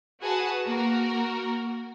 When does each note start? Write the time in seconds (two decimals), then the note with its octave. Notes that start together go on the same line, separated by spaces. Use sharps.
0.22 F#4 G#4 B4 F#5 A5
0.66 A#3 F#4 A#4